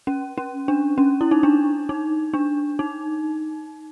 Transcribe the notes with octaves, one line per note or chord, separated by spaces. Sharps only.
C#4
C#4
D4
C#4
E4
D#4
D4
D#4
D4
D#4